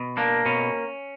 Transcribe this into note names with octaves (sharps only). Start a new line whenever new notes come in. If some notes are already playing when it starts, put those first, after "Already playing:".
Already playing: B2
A#3 D4
B2 C#4